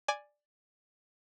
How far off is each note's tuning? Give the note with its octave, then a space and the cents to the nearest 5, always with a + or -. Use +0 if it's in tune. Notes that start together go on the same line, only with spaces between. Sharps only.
D5 +5 G#5 +0